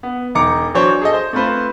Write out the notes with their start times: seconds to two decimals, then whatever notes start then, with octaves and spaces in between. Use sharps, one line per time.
0.03 B3
0.35 E1 D#4 A#5 D6 C#7
0.75 E3 F#3 D4 C5 C#5
1.02 G#4 A4 D#5
1.13 C5
1.33 A3 C4 F4 B4 C5